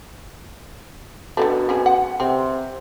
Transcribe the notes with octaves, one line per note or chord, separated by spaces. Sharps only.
B2 D3 E3 A3
C4 C#4 G#4
F#5
C3 C4